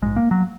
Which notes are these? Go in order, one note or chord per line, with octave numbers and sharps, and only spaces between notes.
A#1 G#2 G#3
A#3
F#3